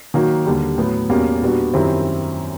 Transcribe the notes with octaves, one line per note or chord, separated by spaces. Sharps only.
D#3 F#3 A#3 D#4 F#4
D#2 D3 G3
A2 F#3 B3
E2 B2 G3 A#3 C#4
A#2 G3 B3 D4 F#4
F#2 D#3 G3 C4 E4